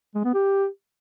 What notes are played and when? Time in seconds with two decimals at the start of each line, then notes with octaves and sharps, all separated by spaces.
0.15 G#3
0.24 B3
0.34 G4